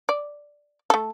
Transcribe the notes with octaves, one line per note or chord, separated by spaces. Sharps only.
D5
A3 A4